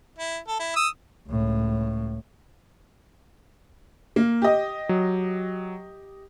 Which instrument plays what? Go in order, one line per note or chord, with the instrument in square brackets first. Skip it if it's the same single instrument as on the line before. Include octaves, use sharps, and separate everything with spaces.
[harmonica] E4
A4
E4
D#6 E6
[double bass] C#2 A2
[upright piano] A#3
G4 D#5
[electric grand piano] F#3